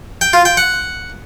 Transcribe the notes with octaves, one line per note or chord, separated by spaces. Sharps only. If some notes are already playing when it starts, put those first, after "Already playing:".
G5
F4
G5
F#5